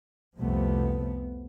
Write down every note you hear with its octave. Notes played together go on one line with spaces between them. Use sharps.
C2 F2 C3 F3 A3 B3